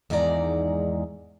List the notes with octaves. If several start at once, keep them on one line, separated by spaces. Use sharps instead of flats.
E2 G#2 D#3 G#3 D5 A#5